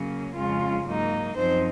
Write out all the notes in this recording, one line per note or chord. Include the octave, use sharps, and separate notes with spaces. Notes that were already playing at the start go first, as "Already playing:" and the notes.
Already playing: C#3 F#3 A#3 C#4
F2 C#3 G#3 C#4 F4
G#2 F#3 A#3 D#4
F#2 F3 C4 D#4 C5